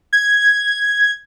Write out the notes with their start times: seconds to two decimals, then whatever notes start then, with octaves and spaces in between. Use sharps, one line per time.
0.13 G#6